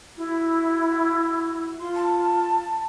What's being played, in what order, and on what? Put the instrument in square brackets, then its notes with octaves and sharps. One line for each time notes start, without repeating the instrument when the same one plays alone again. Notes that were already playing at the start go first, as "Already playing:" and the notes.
[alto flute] E4 [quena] F#4
[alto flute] F4 [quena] C6
[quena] A5